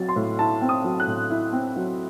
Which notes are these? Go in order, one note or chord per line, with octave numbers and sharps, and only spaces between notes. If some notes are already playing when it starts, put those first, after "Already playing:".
Already playing: F#3 C4 A6
C6
A2
E4 A5
C4
D#6
F#3
F#6
A2
E4
C4
F#3